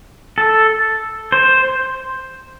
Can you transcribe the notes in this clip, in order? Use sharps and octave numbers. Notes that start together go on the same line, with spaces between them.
A4
C5